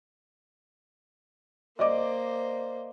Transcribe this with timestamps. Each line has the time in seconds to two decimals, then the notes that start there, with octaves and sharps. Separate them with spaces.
1.79 A#3 C5 D5 D#5 D6